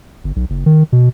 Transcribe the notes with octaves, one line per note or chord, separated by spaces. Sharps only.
G1
B1
F#1
D#3
B2